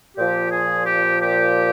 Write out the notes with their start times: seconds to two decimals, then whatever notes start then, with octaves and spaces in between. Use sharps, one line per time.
0.17 A#2 F3 G4
0.51 G#4
0.86 G4
1.21 G4